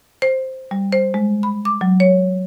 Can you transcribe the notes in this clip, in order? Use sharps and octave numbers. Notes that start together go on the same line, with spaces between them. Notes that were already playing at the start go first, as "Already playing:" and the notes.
C5
G3
C5
G#3
B5
D6
F#3
C#5